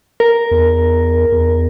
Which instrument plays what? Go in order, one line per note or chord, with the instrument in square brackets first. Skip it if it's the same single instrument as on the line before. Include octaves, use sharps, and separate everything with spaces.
[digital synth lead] A#4
[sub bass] E2
E2